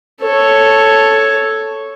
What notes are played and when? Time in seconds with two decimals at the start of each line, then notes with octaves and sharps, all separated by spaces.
0.21 A4 C#5